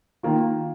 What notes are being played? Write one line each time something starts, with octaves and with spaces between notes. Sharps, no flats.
D#3 A#3 F4